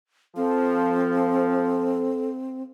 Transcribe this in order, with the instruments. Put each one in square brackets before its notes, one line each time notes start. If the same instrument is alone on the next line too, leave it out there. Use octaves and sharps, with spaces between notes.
[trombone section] F3 [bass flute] C4 [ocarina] A4